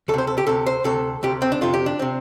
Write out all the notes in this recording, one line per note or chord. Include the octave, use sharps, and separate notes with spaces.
D2 A4
C3 C5
A4
G4
D2 C3 A4
C5
D2 C3 A4
D2 C3 G4
C4
D4
F2 C3 F4
G4
D4
C3 C4